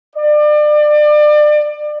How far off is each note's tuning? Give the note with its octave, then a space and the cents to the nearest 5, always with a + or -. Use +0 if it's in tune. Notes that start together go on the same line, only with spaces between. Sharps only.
D5 +30